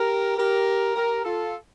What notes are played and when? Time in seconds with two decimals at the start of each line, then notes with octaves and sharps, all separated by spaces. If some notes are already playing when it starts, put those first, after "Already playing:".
Already playing: G4 A#4
0.37 G4 A#4
0.96 G4 A#4
1.25 F4 A4